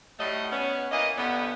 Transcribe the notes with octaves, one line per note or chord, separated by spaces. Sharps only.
A2 F#3 G3 A3 D#5
B3 C#4
E3 A#3 D#5
G2 D3 B3